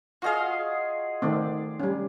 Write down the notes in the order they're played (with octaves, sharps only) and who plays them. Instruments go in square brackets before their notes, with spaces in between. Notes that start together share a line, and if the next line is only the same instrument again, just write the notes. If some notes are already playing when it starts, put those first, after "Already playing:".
[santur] F4 G#4 [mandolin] F#4 D#5 F5
[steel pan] D#3 A3 C4 [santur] D5
[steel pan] G3 C#4